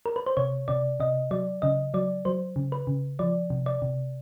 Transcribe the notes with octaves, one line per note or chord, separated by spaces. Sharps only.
A#4
B4
C5
C3 C#5
C3 D5
C3 D#5
F#3 D5
C#3 D#5
F#3 D5
F#3 C5
C#3
B4
C#3
F3 D5
C3
D5
C3